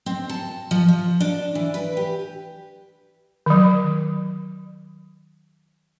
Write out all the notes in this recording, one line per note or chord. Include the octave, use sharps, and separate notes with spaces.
C4
A5
F3
F3
D4
E3
B4
G4
D#3 F#3